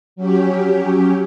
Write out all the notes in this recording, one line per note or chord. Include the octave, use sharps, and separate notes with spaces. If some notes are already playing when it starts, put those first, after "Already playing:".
F#3 C#4 G4